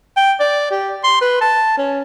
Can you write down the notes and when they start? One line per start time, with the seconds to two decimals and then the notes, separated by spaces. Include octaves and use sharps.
0.17 G5
0.40 D5
0.71 G4
1.04 C6
1.21 B4
1.41 A5
1.78 C#4